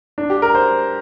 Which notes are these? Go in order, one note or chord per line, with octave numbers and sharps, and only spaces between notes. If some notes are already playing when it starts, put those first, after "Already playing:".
D4
G4
A#4
C5